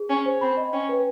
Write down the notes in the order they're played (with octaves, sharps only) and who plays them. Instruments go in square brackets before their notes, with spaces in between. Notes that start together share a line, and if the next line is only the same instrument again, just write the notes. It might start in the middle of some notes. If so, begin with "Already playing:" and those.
Already playing: [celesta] G#4
[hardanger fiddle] C#4 [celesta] G#5
[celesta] C5
[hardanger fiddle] C4 [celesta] B5
[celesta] D#5
[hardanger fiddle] C#4 [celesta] G5
[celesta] B4